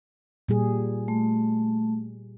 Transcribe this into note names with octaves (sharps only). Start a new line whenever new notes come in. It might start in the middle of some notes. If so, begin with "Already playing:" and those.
A#2 G3 G#4
A3